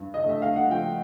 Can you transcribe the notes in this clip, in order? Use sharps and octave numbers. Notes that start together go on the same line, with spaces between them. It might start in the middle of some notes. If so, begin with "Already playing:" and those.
Already playing: G2
D#5
A3
E5
F5
F#5
F3 G5